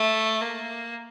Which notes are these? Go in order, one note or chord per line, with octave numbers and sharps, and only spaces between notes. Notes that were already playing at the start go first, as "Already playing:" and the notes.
Already playing: A3
A#3